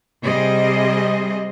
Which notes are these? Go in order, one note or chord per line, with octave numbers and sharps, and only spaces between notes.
C3 G3 G#4 C5 D#5